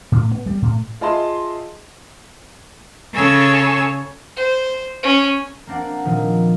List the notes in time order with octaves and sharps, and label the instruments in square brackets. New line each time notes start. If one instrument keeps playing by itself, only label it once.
[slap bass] A2
B3
G3
A2
[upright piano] F4 G#4 D#5 E5 A5 C6
[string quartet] C#3 A4 C#5 G#5 E6
[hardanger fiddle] C5
C#4
[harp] A#3 C4 D4 F#5
A#2 D#3 F3